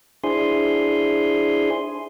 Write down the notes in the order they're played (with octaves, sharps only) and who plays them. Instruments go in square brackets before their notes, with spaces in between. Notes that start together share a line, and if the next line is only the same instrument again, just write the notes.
[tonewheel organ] D4 E4 G#4 C5 G#5 C6